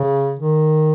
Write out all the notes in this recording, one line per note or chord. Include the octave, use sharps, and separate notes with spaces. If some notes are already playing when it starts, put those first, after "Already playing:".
Already playing: C#3
D#3